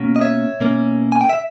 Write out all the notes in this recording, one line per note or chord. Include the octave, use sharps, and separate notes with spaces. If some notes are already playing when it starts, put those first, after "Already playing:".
Already playing: B2 A#3 C#4
D#5
C#5 E5
B2 A#3 C#4
G#5
G5
E5